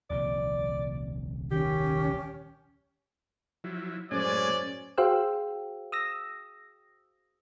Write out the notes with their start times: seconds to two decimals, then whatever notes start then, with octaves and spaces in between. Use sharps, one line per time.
0.10 D#1 C2 F3 D5
1.51 D#3 C#4 G4
3.64 F3 F#3 E4
4.11 F#2 A2 G#3 C#4 C5 D5 G#5
4.98 F#4 G#4 C5 F5 G5 E6
5.92 D#6 E6 A#6